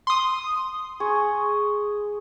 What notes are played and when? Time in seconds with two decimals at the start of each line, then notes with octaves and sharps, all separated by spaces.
0.07 C6 D#6
1.00 G#4 C#6